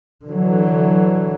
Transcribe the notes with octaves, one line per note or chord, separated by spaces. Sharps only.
D3 E3 F#3